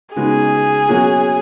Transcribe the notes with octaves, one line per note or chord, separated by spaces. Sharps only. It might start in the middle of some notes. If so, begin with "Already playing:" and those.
C#3 G#3 B3 D#4 F#4 G#4
B2 F#3 A#3 C#4 F#4